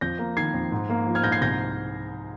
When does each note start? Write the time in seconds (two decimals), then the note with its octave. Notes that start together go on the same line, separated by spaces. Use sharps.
0.01 F2 G6 A#6
0.19 A#3
0.37 D#3 G#6 C7
0.54 F2
0.72 G#2
0.90 A#3
1.07 F3
1.15 F6 G#6
1.23 G#2 G6 A#6
1.32 G#6 C7
1.41 C2 G6 A#6